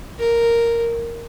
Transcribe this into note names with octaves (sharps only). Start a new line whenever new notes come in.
A#4